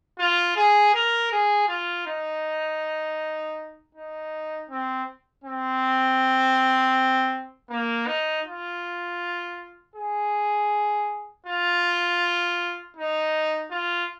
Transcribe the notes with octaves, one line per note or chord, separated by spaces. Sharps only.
F4
G#4
A#4
G#4
F4
D#4
D#4
C4
C4
A#3
D#4
F4
G#4
F4
D#4
F4